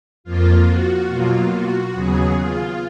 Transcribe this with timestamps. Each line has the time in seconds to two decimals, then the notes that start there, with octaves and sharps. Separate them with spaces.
0.24 F2 F3 A#3 F4
0.66 F#4
1.08 B2 F#3 A#3 F4
1.50 F#4
1.92 D#2 C#3 F#3 B3 G#4
2.35 F4